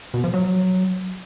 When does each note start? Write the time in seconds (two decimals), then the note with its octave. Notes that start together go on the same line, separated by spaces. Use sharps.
0.14 B2
0.24 F3
0.34 F#3